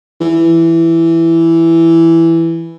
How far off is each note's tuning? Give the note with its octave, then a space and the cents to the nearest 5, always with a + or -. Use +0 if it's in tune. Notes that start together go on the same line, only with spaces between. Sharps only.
E3 +5